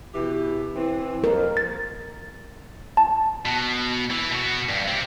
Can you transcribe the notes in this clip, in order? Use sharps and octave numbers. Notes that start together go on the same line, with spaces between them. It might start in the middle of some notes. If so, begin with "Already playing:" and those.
B2 E3 G4
E3 C4
F2 A#4
A6
A5
B2
E3
B2 F#4
G2
C4 G4